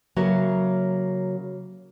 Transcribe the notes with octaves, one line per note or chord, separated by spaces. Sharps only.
C#3 F#3 A#3 F#4 E5